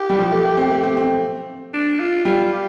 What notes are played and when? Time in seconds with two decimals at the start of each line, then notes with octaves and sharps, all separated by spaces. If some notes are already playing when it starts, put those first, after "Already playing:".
Already playing: G4
0.10 G3
0.19 F3
0.32 A3
0.45 A3
0.57 C4
0.71 A3
0.83 C4
0.97 C4
1.73 D4
2.00 F4
2.25 G3 F4
2.51 G4